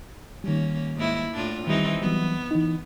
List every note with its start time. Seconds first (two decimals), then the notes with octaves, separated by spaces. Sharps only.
0.44 D#3 G3 A#3 C#4
0.96 G#2 A#3 E4
1.32 A2 D4 F4
1.67 D#3 E3 G3 C4 D#4
2.02 E3 F#3 G3 B3
2.51 E3 D#4